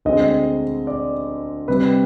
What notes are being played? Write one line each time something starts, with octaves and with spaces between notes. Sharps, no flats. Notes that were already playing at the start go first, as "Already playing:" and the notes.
D2 D3 G#3 C4 D#5
D5
C3 G3 C4 B4